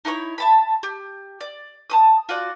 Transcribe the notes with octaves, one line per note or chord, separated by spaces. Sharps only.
D#4 E4 B4 C#5
E5 A5 B5
G4
D5
A5 C6 D#6
F4 F#4 D5 F#5